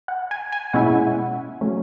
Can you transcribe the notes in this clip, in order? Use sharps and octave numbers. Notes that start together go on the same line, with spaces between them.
F#5
G#5
G#5
B2 G#3 C#4 E4 F#5
F#3 A3 C#4